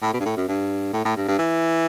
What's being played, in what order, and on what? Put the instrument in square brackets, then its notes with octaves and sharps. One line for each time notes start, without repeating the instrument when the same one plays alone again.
[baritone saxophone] A2
B2
G2
A2
F#2
G2
A2
A2
G2
G2
E3